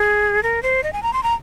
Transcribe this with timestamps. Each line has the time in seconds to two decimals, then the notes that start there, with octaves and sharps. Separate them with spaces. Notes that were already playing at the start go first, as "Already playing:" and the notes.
Already playing: G#4
0.43 A#4
0.63 C5
0.83 D#5
0.93 G#5
1.03 A#5
1.13 C6
1.23 A#5